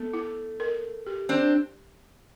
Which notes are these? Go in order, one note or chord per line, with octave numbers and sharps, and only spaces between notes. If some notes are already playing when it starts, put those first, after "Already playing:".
Already playing: A3 B3
E4
A#4
G4
C4 D4